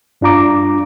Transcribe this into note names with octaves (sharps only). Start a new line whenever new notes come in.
G2 D4 F4 A#5 D6